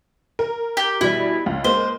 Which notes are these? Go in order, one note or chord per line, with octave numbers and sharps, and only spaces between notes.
A#4
G4
B2 E3 G3 E4
C#2
G#3 A#3 C5